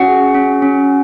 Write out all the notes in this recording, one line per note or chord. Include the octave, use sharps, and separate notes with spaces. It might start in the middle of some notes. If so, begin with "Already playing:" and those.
Already playing: C#4 F#4 F#5
G#4
C#4
C#4